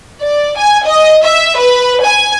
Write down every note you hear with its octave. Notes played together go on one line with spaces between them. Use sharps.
D5
G#5
D#5
E5
B4
G#5